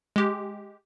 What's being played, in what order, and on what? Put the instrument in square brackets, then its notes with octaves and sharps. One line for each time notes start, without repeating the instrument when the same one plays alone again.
[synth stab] G#3 G4